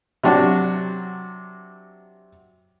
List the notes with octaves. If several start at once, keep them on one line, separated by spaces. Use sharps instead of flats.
C3 F#3 D4 F#4